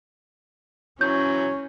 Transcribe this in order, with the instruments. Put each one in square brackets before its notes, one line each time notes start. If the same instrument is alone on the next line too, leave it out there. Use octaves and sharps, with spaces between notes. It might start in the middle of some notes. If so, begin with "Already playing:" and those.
[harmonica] E3 F#3 [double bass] C#4 [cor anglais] C#5 [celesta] G6